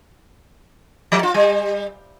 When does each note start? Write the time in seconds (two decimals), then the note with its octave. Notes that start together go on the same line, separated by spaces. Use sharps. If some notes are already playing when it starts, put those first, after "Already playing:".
1.12 F3
1.23 F4
1.34 G3